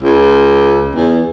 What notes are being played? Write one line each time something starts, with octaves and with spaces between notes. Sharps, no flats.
C#2
E2